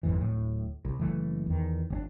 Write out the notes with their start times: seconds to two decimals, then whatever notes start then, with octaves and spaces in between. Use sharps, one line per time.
0.03 G1 F2 G#2 E3
0.18 D1 A2
0.85 C2
1.00 F#1 E3 A3
1.46 E2 D#3
1.90 G1 C4 D4